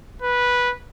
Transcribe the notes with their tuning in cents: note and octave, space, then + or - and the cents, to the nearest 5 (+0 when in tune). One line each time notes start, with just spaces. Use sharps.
B4 -10